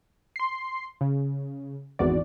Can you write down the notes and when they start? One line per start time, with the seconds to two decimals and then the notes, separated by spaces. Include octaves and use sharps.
0.36 C6 C7
1.01 C#3
1.99 G#1 E2 F#4 D5